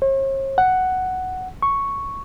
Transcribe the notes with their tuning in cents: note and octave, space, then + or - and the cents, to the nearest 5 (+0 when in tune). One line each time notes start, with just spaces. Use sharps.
C#5 -45
F#5 +5
C#6 +0